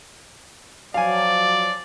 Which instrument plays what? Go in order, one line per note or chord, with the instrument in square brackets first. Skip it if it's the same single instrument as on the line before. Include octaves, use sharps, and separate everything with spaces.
[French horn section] F3 F#3 [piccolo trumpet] D5 [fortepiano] F5 G#5